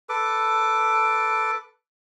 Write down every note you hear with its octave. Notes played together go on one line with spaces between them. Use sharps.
A4 B4 D6